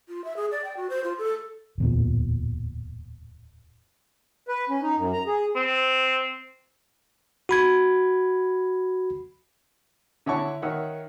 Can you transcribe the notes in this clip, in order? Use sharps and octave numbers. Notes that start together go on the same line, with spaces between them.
F4
E5
G#4
D5
G5
F#4
C5
F4
A4
D1 E2 A#2
B4
C#4
D#4
F#2
A#5
G#4
C4
F#4 B5 G#6
D3 E4 C#5 F#5 A5 C#6
D#3 C#5 E5 F#5